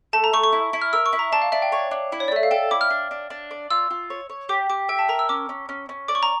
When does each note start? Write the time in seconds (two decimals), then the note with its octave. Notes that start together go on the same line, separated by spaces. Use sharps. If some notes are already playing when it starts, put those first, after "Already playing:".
0.13 A3 A5
0.24 A#5
0.33 A3 C#6
0.43 C#6
0.52 E4
0.73 E4
0.82 F6
0.93 A#4 E6
1.06 C#6
1.13 E4
1.19 A#5
1.32 D4 A5
1.42 F5
1.52 D4 E5
1.62 G5
1.72 C#5
1.91 D4
2.12 E4
2.20 C#5
2.28 D5
2.32 A3 E5
2.43 F5
2.51 A4 G5
2.71 E4 D6
2.81 F6
2.90 D4
3.11 D4
3.30 D4
3.51 D5
3.70 F4 E6
3.91 F4
4.10 C#5
4.30 C#5
4.49 G4 D6
4.70 G4 D6
4.89 E5 G5
4.99 A5
5.09 A#4 A#5
5.19 E6
5.29 C#4 D6
5.49 C#4
5.69 C#4
5.89 C#4
6.08 D5 D6
6.15 C#6
6.23 A#5